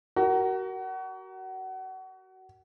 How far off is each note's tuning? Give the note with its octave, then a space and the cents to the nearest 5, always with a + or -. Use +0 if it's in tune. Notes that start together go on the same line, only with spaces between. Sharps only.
F#4 +30 A#4 +0